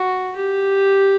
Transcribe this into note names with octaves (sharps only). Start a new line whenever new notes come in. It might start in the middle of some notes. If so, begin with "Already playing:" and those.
Already playing: F#4
G4